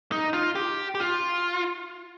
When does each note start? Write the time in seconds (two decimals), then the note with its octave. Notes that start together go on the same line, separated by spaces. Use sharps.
0.12 D#4
0.34 F4
0.55 G4
0.95 G4
1.00 F4